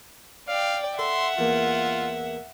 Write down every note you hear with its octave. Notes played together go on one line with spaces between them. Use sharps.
D5 F5 G5
A4 E5 F#5 C6
E2 A#3 F4